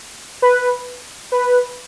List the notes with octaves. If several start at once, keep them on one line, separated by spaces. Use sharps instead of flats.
B4
B4